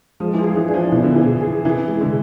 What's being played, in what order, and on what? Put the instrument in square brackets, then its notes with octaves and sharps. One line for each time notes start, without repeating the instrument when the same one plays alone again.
[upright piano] F3 [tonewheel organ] G#3
[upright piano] E3
F3
[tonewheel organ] G#4
[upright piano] E3
[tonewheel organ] D4
[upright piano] F3
[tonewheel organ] B2 [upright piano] E3
[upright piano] D3
[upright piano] E3 [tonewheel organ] G#4
[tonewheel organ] G#4
[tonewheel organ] C3 [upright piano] E3
[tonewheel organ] G#3
[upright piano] D3